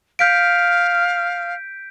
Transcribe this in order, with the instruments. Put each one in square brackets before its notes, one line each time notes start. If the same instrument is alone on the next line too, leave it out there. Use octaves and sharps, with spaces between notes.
[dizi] F5 [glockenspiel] G6 B6 D7